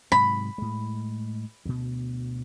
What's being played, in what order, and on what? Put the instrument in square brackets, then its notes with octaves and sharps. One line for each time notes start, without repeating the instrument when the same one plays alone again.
[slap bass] G#2 C3 F#3 [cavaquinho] B5
[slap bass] A2 G#3
D2 B2